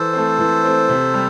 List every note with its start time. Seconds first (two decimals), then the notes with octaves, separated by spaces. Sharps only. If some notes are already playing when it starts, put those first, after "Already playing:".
Already playing: E3 A4 C5
0.13 A3 C4
0.39 E3
0.64 A3 C4
0.89 C3
1.14 G3